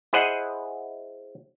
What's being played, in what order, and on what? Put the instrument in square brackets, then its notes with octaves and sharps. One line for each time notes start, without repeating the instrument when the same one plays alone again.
[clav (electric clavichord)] E4 G#4 C5 D#5 F#5